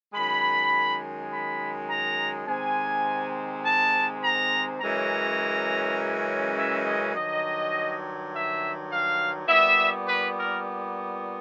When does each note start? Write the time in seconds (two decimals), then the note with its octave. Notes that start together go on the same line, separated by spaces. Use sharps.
0.13 F#2 D#3 G#3 B5
1.30 B5
1.89 A#5
2.47 C3 D#3 G#3 C4 G#5
3.65 A5
4.22 A#5
4.81 F#2 C#3 E3 G#3 C#4 A#5
6.57 E5
6.85 D#5
7.14 G2 D#3 F#3 D#5
8.32 E5
8.90 F5
9.48 A#2 G3 B3 E5
10.07 B4
10.37 A#4